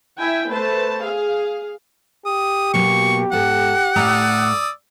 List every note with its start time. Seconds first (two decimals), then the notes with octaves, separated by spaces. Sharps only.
0.18 E4 E5 G5 G#5
0.50 A3 B4 C5 A5
1.01 G#4 F5
2.26 G4 D#6
2.74 B2 F#3 A#3 C#6
3.32 G#2 A4 F#5
3.96 A2 A3 D5 A#5 D#6 E6